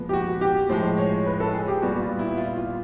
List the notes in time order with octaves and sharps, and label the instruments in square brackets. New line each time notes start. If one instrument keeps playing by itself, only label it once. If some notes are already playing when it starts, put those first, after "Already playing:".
Already playing: [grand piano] A#2 F3 G#3 B3
G4
F#4
G4
A2 F3 G#3 C5
C#5
B4
A4
G#4
G4
A#2 G3 B3 F#4
F4
E4
F4
F4